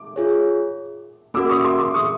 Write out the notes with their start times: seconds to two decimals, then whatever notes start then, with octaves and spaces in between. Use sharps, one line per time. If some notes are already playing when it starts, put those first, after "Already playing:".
Already playing: D6
0.16 F4 G#4 C#5
1.34 A#3 C#4 F#4 A#4 D6 E6
1.49 C#6 D#6
1.64 C6 D6
1.79 C6 D6
1.94 C#6 D#6